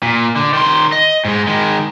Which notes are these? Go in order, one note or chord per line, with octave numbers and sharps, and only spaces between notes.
A#2
D3
D#3 C6
D#5
G#2 G#3
D#3 G#3